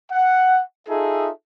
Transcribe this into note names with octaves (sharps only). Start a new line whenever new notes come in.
F#5
D#4 F4 G#4 A4 E5